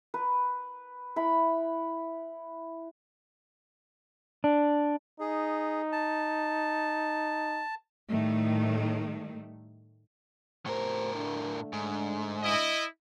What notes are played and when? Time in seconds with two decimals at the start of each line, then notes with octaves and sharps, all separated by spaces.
0.14 B4
1.16 E4 B5
4.44 D4
5.20 D#4 G#4
5.92 A5
8.09 A2 D#3 G3 A3
10.66 F2 A2 G4 A#4 C5
11.14 D3 A3 D4
11.73 G#2
12.42 E4 D#5